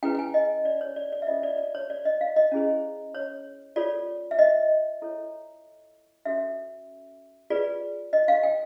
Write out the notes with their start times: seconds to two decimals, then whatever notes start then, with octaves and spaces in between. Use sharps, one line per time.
0.03 C#4 E4 G#4 B4 G5
0.15 G5
0.19 G#5
0.34 D#5
0.65 D5
0.81 C#5
0.96 D5
1.13 D5
1.22 E5
1.27 C#4 F4 A4 D#5
1.43 D5
1.58 D5
1.75 C#5
1.90 D5
2.05 D#5
2.21 F5
2.36 D#5
2.52 C#4 E4 G#4 C5
3.15 C#5
3.76 F4 A4 C#5 D5
4.31 E5
4.39 D#5
5.02 E4 A4 C#5
6.25 C#4 F#4 A4 C#5 E5
7.50 F4 G#4 B4 D5
8.13 D#5
8.28 F5
8.43 G5